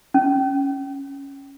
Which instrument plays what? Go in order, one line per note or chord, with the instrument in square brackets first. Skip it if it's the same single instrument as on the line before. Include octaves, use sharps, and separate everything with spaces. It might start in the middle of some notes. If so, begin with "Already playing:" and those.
[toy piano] C#4